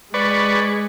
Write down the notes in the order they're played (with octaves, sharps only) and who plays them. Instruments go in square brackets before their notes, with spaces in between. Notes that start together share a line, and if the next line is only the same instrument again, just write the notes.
[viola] G#3 [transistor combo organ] B4 D5 C#6